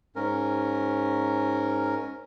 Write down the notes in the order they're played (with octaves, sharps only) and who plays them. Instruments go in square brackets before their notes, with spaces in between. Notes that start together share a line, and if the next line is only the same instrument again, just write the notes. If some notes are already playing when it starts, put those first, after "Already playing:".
[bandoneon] G#2 C#4 A#4